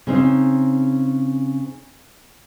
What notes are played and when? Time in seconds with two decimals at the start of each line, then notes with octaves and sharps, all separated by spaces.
0.07 C#3 C4 D#4